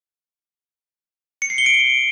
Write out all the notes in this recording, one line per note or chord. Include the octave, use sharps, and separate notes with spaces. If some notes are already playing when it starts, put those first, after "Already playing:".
C#7
C7
G7
D7